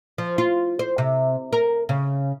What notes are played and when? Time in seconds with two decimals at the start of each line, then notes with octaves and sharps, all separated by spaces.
0.18 F3
0.38 F4
0.79 C5
0.98 C3
1.53 A#4
1.89 C#3